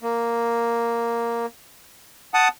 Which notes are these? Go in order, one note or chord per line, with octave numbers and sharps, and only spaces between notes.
A#3
F#5 A5 D#6